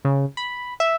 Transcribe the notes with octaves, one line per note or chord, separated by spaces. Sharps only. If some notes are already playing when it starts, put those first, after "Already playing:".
C#3
B5
E5